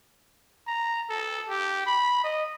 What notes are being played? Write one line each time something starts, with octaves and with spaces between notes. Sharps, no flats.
A#5
A4
G4
B5
D#5